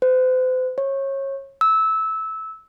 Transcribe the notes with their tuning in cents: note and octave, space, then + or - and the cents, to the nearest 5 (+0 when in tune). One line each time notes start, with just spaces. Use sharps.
C5 -40
C#5 -25
E6 -15